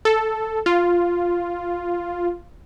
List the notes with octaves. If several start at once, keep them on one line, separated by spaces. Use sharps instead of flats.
A4
F4